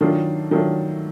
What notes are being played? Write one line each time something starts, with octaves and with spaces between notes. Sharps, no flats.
D#3 F#3 A3 D4 F4
D#3 F#3 A3 D4 F4